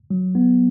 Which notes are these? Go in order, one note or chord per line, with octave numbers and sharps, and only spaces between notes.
F#3
B3